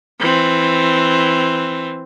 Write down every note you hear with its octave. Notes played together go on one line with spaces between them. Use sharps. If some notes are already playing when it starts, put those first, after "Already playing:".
E3 C4